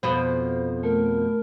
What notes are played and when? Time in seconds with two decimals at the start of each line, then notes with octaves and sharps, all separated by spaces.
0.03 F2 B2 B3 C5
0.83 A3 A#4